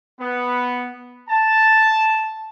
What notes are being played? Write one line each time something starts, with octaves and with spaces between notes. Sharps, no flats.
B3
A5